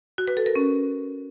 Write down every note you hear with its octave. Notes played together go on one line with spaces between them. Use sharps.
F#4
B4
A4
A#4
C#4